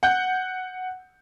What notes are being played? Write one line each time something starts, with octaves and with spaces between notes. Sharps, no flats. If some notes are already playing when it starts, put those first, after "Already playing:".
F#5 G6